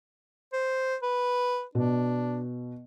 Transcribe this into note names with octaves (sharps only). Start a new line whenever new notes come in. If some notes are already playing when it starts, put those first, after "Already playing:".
C5
B4
B2 D4